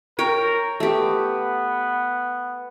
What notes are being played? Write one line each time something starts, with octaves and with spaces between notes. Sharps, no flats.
A#4 C#5 G5
A3 B3 G4